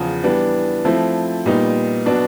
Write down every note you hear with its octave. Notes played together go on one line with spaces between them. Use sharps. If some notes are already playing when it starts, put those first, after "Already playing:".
Already playing: E2 C#3 F3
E3 G3 B3 D4
F3 A3 C4 E4
A#2 G3 B3 D#4
B2 F#3 B3 D4 F#4